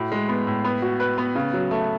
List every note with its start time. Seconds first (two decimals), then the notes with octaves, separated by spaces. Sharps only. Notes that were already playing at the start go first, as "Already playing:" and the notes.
Already playing: A2 F#4
0.12 G#3
0.29 B3
0.47 A2
0.65 B3
0.82 F#4
1.00 B4
1.18 B3
1.35 C#3
1.53 F#3
1.71 A3